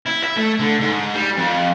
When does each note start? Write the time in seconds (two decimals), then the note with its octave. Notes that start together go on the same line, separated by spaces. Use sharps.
0.06 E4
0.24 E5
0.37 A3
0.60 D3
0.80 G#2
1.15 G3
1.37 F2